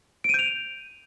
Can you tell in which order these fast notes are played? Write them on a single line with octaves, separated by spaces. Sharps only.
D7 D#7 G6 F7